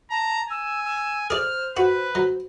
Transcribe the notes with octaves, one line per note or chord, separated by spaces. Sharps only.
A5 A#5
G#5 E6
E6
G#4 C5 D5 F6
F#4 B4
F#3